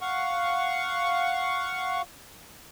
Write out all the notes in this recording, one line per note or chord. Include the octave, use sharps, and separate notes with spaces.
F5 F#5 C#6